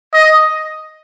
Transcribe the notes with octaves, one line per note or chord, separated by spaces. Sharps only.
D#5